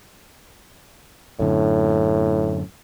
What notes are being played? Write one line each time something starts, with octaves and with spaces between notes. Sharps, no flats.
F#2 A2 D3